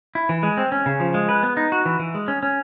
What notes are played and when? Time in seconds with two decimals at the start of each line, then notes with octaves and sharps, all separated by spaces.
0.15 E4
0.29 E3
0.43 G#3
0.57 C4
0.72 C#4
0.86 C#3
1.00 F3
1.14 G#3
1.29 B4
1.43 B3
1.57 D#4
1.72 F#4
1.86 E3
2.00 E3
2.15 G#3
2.28 C#4
2.43 C#4